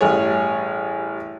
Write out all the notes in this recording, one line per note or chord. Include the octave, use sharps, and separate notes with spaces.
A1 G2 G#4 C#5